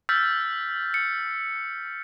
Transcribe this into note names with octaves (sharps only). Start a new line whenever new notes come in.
E6 F6 G6 A6 B6
C#7